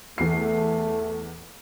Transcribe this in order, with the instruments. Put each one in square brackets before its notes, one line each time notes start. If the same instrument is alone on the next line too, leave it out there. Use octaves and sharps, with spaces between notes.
[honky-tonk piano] E2 C7 [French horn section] A3